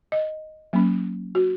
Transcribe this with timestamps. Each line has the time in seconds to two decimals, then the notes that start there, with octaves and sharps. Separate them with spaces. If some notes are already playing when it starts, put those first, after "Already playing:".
0.12 D#5
0.73 F#3 A#3 C#4
1.35 F#4